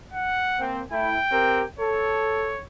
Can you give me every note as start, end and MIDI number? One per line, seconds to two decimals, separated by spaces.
0.14 0.64 78
0.60 0.82 58
0.60 0.82 60
0.92 1.17 57
0.92 1.17 64
0.92 1.67 79
1.31 1.63 60
1.31 1.63 67
1.31 1.63 70
1.79 2.55 69
1.79 2.63 73